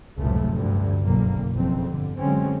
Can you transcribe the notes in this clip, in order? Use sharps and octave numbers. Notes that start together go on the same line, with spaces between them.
F1 C#2 F#2 A2 F3 A3
D2 G2 D3
F#1 B1 D3 A#3
F#1 F2 C4
G1 D3
F#2 D3 G#3 C4 C#4